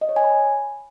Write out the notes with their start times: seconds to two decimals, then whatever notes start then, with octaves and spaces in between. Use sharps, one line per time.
0.01 D#5
0.09 C#5
0.16 G#5
0.24 B5